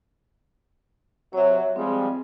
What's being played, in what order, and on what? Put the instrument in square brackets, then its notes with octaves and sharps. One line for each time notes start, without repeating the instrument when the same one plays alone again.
[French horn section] C3 F#3 [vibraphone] C#5 E5
[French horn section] F3 G3 G#3 [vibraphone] C4